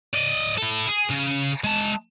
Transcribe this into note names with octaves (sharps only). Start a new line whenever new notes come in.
D5 D#5
E4 A4
G#4
C#3
G#3 A5